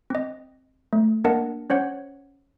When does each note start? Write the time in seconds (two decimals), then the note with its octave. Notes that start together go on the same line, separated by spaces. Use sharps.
0.10 C4 D#5
0.93 A3
1.24 A#3 D4 A#4 D#5 F#5 A5
1.70 C#4 C5 C#5 F#5